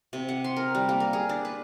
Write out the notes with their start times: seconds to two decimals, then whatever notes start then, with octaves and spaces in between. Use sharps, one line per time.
0.13 C3
0.29 F#5
0.44 C6
0.56 A#4
0.75 G3
0.89 A#3
1.00 A#4
1.13 G#4
1.29 D4
1.45 B4